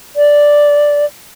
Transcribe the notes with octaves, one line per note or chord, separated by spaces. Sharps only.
D5